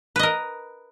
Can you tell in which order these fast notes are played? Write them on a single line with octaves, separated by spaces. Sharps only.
B4 D#5 A#4